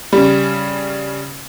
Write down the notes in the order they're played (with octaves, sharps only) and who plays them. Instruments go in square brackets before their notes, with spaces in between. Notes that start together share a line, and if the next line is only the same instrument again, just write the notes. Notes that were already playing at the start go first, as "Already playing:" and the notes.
[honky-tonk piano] C#3 G3